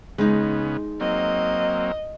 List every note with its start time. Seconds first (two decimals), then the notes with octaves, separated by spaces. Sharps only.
0.18 C#3 G#3 B3 D#4
1.01 F#3 A#3 C4 D#5